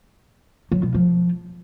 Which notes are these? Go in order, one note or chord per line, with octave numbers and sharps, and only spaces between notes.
F#3
B2
F3